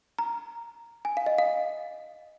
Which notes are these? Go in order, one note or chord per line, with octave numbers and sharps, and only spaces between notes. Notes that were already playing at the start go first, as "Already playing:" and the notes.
A#5
G#5
F5
D#5
F5